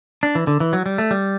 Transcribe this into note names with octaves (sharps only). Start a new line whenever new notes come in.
D4
E3
D3
E3
F#3
G3
A3
G3